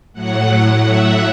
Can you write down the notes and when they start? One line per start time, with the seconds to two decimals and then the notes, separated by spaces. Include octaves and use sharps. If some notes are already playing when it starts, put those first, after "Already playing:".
0.13 A2 F#3 F#5
0.84 E5